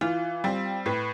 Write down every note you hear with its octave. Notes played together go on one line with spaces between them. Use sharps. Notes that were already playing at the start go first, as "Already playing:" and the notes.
E3 F4
G3 C4
A2 B4